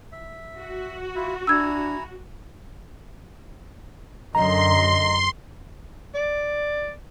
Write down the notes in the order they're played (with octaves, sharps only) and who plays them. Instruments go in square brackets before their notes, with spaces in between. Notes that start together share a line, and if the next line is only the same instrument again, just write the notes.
[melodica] E5
[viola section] F#4
[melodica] E4 F4 E5
[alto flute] D4 [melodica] E4 G#5 A#5 [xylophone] E6 G#6
[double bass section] F#2 D3 [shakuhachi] D#5 [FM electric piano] A#5 [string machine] C6
[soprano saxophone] D5